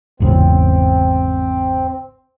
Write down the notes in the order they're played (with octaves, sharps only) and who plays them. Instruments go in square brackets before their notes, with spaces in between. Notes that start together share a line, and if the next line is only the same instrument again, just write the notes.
[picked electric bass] G#1 E2 C#3 [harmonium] C4